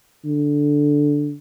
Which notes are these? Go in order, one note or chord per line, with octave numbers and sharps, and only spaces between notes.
D3